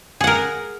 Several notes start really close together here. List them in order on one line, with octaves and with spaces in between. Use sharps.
G#4 F#5 A#4